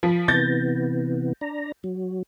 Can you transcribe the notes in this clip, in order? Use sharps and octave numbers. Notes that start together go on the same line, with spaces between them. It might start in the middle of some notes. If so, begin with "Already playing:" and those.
F3 B5
C3 E3 B3 G6 A6 A#6
D4 A#5
F#3